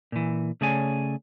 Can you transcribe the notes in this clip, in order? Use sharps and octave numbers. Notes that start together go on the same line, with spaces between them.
A#2 E3
C#3 A3 G#4 C#5 D5 G#5